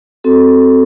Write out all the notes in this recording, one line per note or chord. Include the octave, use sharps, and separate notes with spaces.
C4 F#4 A4